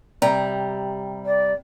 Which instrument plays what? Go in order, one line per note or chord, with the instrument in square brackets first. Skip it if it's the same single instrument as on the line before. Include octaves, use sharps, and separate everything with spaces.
[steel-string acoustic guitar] C3 G3 A#5
[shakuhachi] D5